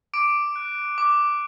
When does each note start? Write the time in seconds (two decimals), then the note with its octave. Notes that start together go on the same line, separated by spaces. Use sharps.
0.14 D6 D7
0.56 F#6
0.98 D6